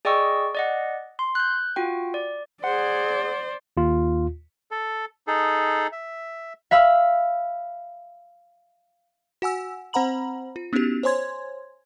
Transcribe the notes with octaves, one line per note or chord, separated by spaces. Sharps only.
G#4 D5 D#5 G5 C#6 E6
D5 D#5 F#5
C6
F#6 G6
F4 F#4 G5
D5
G#4 C5 D5 F#5
D#2 F4
A4
D#4 G#4 A4
E5
E5 F5 B5 E6
F#4 F#5 G#5 E6
C4 C5 F#5 A#5 B5 F#7
F4
B3 C#4 D#4 E4 F#4 G4
C5 C#5 G#5 C6 G#6